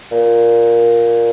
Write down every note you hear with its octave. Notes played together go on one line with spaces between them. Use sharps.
A#2